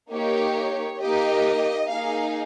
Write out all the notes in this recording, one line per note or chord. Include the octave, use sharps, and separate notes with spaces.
A#3 D#4 G4 C#5
A#3 D#4 G4 D#5
A#3 D#4 G#4 F5